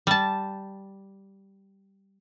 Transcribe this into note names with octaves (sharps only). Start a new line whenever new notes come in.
G3 A5